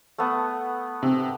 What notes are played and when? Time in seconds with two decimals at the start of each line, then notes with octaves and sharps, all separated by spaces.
0.18 A3 B3
1.03 C3